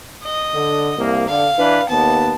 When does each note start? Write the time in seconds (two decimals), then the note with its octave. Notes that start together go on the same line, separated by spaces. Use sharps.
0.24 D#5
0.54 D3
0.98 C2 A#3
1.29 D3 F5
1.58 E3 D4 B4
1.90 D#2 B3 A5